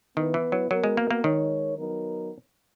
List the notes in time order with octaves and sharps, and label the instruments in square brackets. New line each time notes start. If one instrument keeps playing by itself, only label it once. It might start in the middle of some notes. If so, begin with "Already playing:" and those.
[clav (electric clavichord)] D#3 [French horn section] B3 E4 B4
[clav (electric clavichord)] E3
F#3
[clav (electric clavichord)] F#3 [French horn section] B3 F#4 A#4
[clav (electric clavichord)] G#3
A#3
A#3
[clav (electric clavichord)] D#3 [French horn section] G#3 D#4 A#4 C#5
[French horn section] F#3 B3 D#4 A#4